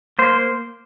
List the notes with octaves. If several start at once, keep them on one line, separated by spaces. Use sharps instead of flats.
A#3 C5